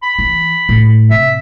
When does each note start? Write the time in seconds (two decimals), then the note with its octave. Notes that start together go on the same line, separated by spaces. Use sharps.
0.03 B5
0.19 E3
0.69 A2
1.10 C3 E5